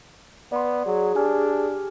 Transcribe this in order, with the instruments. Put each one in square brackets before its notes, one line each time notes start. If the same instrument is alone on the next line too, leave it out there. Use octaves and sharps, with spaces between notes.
[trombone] B3 [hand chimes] D5 C6
[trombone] F#3 [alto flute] G#4
[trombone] D4 [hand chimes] G4 G#5 F6